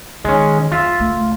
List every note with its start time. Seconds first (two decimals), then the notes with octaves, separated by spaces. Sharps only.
0.25 D#3 G#3 C#4
0.72 F2 F#3 F4 E5
0.98 C#2 A3